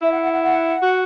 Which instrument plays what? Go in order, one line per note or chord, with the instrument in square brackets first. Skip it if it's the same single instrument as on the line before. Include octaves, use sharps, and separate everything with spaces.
[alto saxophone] E4 [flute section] E5
[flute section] F#5
F#5
F#5
F#5
[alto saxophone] F#4